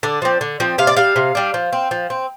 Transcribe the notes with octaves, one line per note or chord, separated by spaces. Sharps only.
D3 D5
F3 C4
D3
F3 C4
C3 F5
D5
G3 D4 F5
C3
G3 D4
F3
C4
F3
C4